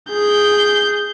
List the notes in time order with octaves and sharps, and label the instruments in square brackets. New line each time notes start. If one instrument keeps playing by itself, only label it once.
[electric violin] G#4 G6